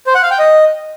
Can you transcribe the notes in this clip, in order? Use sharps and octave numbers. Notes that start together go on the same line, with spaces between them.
C5
F#5
F5
G5
D#5